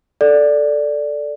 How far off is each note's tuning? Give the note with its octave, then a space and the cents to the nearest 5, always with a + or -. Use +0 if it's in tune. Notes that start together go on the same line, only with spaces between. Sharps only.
A4 +0 D5 +0